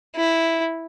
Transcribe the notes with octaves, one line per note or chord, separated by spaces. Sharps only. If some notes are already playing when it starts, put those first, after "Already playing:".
E4